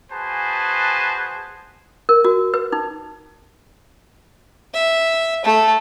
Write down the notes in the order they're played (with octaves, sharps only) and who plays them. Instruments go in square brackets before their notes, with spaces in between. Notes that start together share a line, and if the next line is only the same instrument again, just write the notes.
[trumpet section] F#4 G#4 B4 C5 G#5 A5
[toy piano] A#4
F#4
B4
D#4
[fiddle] E5
A3 A4